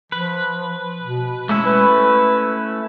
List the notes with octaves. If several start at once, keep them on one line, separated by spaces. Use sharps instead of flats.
F3 B4
B2
G#3 A3 C#4 E4
B4